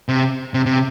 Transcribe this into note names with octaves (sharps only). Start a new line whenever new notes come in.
C3
C3
C3